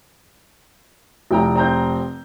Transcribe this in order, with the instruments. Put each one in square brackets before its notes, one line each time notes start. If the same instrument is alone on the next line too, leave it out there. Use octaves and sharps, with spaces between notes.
[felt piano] F1 [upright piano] E4 G5 A#5
[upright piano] C4 A#5 G6